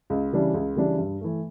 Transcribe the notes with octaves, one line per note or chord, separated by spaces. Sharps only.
C#2
C#3 E3 G3 D4
C#2
C#3 E3 G3 D4
G2
E3 A3